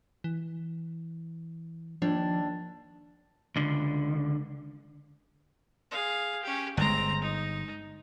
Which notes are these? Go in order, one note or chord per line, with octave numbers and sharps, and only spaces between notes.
E3
D#2 F3 D4
C#2 D3
G#4 F5
C#4 G4
G1 G#3 C4 A#5
D#4